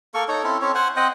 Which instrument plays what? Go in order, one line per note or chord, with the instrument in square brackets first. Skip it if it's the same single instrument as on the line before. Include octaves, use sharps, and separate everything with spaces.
[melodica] A#3 A4 C#6
D#4 A4 C#5
C4 C#4 E4 A4
C4 C#4 C#5
C5 F#5 G#5
C4 D#5 F#5 G5